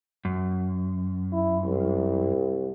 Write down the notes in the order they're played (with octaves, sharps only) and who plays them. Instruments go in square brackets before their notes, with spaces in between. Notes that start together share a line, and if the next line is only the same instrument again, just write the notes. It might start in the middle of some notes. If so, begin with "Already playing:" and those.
[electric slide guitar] F#2
[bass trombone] E4
C2